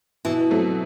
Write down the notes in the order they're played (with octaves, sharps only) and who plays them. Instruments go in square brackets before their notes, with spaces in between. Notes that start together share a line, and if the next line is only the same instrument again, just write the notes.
[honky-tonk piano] B2 [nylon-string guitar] E3
[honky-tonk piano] F#3 A3 C4